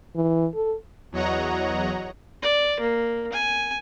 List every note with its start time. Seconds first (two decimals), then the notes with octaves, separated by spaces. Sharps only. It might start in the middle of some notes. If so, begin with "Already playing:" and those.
0.15 E3
0.55 A4
1.12 E2 F#3 C#5 D#5 F#5 A#5
2.43 D5
2.80 A#3
3.33 G#5